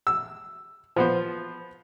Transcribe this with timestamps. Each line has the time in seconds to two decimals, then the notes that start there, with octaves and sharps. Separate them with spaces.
0.07 E6
0.96 F3 B3 C5